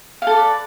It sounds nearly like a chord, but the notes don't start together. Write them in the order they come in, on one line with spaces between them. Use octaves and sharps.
F5 A4 D5 B4